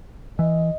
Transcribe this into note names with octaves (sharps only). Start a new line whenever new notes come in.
E3 D#5